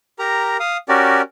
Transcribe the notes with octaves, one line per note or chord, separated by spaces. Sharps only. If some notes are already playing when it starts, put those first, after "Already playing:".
G4 A#4 A#5
F5 D#6
C#4 F#4 G4 A#4 D5